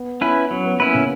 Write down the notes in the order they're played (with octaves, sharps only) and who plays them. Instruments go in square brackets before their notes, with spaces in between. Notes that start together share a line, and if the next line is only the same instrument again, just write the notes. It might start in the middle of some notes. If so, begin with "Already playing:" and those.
Already playing: [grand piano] B3
[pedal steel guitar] C#4 E4 B4
[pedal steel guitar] F#3 [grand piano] C#4
[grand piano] B3
[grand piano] A#3 [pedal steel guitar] C#4 E4 B4
[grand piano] C#3